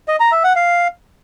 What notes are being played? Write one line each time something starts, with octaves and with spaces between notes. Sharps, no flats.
D#5
A#5
E5
F#5
F5